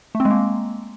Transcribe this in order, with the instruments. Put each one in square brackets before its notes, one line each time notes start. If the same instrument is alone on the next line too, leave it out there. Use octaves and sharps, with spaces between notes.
[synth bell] A3
C4
G#3
A#3